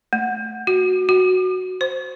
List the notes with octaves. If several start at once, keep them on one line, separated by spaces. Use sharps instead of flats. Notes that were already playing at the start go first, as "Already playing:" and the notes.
A3
F#4
F#4
C5